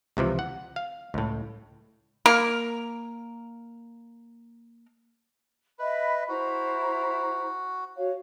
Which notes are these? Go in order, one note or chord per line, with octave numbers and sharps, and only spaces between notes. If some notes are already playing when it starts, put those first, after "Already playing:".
C#2 C3 E3 F3
F#5
F5
C#2 A2
A#3 A#4
B4 D#5 E5 B5
E4 F#4 C5 A#5
F#4 C#5 F5